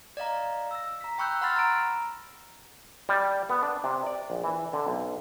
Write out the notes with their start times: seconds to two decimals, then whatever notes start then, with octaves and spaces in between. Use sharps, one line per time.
0.17 D5 D#5 F5 A#5
0.71 E6 A#6
1.01 A#5 B6
1.18 G5 B5 C#6 E6 F#6 G6
1.42 F#5 B5 C6 E6 F6 A6
1.56 A#5 D7
3.09 G3
3.49 B3
3.63 D4
3.84 C3
4.07 D5
4.30 A#1
4.44 E3
4.73 D3
4.87 B1